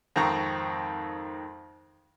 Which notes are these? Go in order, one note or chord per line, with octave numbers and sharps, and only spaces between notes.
F2 G#2 D#3 C4 A#5 C#6